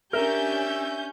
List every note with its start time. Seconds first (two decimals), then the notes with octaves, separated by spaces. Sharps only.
0.13 C#4 D4 G4 A#4 E5 G6